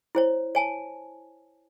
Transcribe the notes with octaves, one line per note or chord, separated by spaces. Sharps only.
E4 C5 C#5
C#5 G#5 A5